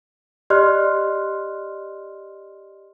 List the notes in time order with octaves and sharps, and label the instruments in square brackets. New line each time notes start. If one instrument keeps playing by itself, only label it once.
[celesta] G4 D5 D#5 C6 F6 F#6